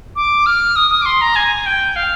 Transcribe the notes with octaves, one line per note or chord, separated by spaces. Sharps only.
D6
F6
D#6
D#6
D6
C6
A#5
G#5
G5
F5